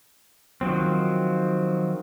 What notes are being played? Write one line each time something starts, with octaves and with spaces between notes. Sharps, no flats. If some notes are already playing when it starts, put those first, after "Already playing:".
D#3 F3 F#3 C4